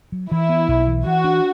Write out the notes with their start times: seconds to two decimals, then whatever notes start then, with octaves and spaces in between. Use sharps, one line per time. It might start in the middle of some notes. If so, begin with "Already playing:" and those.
0.12 F#3
0.31 E3 E4
0.49 B3
0.68 B1
0.87 E3
1.06 E3 F#4
1.24 D4